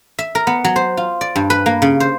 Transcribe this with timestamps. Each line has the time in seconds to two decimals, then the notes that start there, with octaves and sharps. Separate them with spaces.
0.19 E5
0.35 A#4
0.47 B3
0.64 F#3
0.76 C5
0.97 F4
1.21 D5
1.36 G2
1.50 B4
1.66 A#3
1.82 C#3
2.00 C5